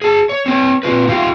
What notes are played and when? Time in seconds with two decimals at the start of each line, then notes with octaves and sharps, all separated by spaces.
0.02 G#4 A5
0.29 C#5
0.46 C4 C#5 G5
0.83 A#2 C4 F4 B4
1.07 D#4 F4 G4 F5